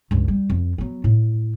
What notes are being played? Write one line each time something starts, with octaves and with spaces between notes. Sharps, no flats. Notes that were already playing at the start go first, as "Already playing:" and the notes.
C#2 G2
G3
F2
F#3 B3
A2